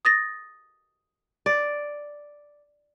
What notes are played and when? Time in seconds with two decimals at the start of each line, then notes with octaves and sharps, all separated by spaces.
0.05 D#6 A6 A#6
1.46 D5